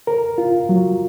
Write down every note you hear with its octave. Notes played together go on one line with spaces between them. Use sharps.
A#4
F4
F#3